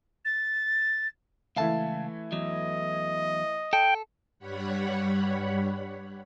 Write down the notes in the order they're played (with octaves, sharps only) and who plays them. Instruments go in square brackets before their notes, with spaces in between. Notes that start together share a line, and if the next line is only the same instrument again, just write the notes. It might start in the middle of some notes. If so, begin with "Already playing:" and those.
[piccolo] A6
[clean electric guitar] C#2 F5 A5 [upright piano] E3 A3 E4
[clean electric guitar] E2 F#3 [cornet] D#5
[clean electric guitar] A4 [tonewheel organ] G5
[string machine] G2 G3 C#5 F#5 B5